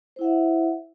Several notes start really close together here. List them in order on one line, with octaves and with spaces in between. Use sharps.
C5 E4 F#5 E5